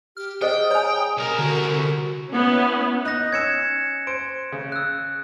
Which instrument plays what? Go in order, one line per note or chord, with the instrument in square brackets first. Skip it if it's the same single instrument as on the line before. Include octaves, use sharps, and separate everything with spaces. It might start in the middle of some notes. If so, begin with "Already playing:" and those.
[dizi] G4 [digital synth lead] F6
[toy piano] G#4 C5 D#5 [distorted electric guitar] G5 [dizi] D#6
[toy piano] C#5 G#5 [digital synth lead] A#5
[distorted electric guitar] C2 A#4
[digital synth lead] D3 [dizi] F#4
[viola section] B3 C#4 E4
[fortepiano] D#4 [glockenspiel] F#6 A#6
[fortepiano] C#4 E6 [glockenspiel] G#6 C#7 E7
[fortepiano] C5 [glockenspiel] D7
[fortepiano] C#3
[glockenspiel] E6 F#6